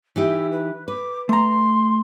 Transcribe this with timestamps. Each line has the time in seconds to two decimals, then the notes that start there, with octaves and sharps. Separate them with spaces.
0.16 E3 D#4 E4 G4
0.52 B4
0.88 B4 D6
1.29 A3 A#5 C6